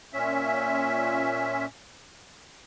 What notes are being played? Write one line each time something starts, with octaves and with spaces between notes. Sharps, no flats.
A#2 C#4 E5